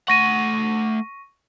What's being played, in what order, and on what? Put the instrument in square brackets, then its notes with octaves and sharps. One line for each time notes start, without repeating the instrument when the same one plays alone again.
[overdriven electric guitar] A3 F#5 [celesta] C#6 A#6 D#7